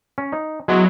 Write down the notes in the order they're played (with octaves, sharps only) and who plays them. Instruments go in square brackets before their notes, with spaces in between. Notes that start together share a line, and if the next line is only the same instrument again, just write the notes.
[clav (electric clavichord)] C#4
D#4
[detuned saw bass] F#3 [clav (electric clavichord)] G#3 B3 E4